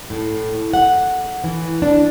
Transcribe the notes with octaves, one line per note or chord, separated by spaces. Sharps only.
A2
F#5
E3
D4